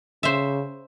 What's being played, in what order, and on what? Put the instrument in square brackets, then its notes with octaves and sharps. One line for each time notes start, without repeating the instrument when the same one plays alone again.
[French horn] C#3 [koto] C5 E5